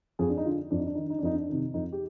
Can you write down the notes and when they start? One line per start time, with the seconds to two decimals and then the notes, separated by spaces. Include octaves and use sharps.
0.19 F2 G#4
0.29 D4
0.38 D#4
0.45 D3 F4
0.71 F2 D4
0.79 D#4
0.87 D4
0.95 D#3 D#4
1.03 D4
1.10 D#4
1.19 D4
1.23 F2 D#4
1.34 D4
1.49 C3 D#3
1.74 F2 D#4
1.93 G4